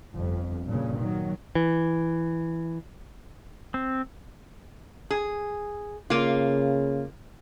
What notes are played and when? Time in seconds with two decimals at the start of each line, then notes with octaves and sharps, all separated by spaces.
0.14 G1 F2
0.67 G2 A#2 C#3
1.00 D#3 F#3
1.55 E3
3.74 C4
5.10 G#4
6.10 C#3 A#3 F4